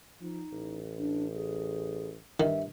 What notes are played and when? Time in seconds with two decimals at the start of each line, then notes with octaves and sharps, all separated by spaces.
0.21 F3 D#4
0.52 A1
0.98 D4
1.34 G#4
2.40 G2 D#3 E5